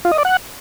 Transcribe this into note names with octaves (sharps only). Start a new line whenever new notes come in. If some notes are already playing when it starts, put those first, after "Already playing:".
F4
D#5
D5
F#5